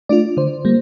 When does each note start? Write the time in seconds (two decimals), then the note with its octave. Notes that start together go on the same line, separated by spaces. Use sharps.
0.09 A3 D4 F4 D5
0.37 D3 C5
0.65 G3 A#3